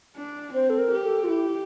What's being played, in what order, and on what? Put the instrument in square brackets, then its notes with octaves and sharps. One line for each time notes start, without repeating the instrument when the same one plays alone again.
[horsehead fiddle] D4
[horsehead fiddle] C4 [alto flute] C5
[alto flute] A4
A#4
[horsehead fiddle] G4
[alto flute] A4
F4
[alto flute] E4 [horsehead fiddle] G4